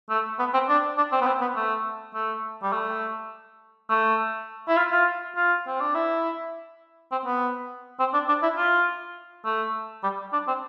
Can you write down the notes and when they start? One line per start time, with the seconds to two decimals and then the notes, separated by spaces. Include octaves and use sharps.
0.10 A3
0.39 B3
0.54 C4
0.69 D4
0.97 D4
1.12 C4
1.21 B3
1.27 C4
1.41 B3
1.56 A3
2.14 A3
2.63 G3
2.72 A3
3.90 A3
4.68 E4
4.77 F4
4.92 F4
5.36 F4
5.67 C4
5.80 D4
5.95 E4
7.12 C4
7.25 B3
8.00 C4
8.14 D4
8.28 D4
8.43 E4
8.57 F4
9.45 A3
10.03 G3
10.33 D4
10.48 C4